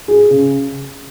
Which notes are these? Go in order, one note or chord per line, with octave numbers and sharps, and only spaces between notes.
G#4
C#3